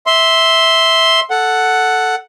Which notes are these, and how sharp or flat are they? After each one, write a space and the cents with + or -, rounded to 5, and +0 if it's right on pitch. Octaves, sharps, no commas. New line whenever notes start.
E5 -10 C6 +0
A4 +0 F#5 +0